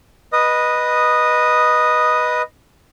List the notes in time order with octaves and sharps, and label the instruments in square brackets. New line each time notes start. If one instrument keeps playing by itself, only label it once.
[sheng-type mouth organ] B4 D#5 D#6